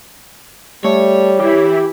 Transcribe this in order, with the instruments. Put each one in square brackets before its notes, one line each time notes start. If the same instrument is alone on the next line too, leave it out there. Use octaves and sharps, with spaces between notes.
[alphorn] G3 [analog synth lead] A3 [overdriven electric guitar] C#5
[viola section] E3 E4 [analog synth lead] G4